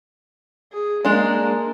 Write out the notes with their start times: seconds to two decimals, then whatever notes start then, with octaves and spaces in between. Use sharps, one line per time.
0.73 G#4
1.05 G#3 A#3 D4